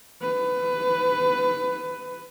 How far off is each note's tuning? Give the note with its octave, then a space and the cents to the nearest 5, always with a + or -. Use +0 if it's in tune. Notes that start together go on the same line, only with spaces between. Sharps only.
B4 +20